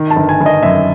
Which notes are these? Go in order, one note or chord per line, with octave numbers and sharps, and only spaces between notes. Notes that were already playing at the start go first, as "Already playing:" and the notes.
Already playing: D#3
A5
G1
G#5
G1
D#5
F#2 E5